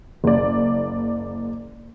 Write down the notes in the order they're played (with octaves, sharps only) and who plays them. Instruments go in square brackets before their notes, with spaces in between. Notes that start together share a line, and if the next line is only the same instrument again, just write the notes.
[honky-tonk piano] F#1 D5